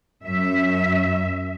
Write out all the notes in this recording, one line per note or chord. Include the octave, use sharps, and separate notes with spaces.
F#2 E5